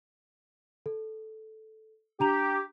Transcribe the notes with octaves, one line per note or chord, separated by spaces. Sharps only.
A4
D4 G4 A#5 F7